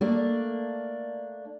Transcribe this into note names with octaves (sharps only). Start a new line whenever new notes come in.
A3 A#3 D4